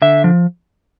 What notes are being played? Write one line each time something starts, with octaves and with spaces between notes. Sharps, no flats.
D3 E5
F3